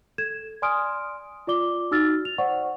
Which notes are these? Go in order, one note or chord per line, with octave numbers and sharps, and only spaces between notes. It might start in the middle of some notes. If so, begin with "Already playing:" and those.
A4 G#6 E7
D5 G#5 C6 D#6 F6 D7
F4 D5 D6 G7
D#4 F#4 E6 F6 A6
F7
C5 D5 F#5 C#6